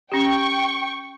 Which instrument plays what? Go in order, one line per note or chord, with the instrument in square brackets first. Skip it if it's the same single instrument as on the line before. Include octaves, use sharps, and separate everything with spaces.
[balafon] C#4 G4 [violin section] G5 C#6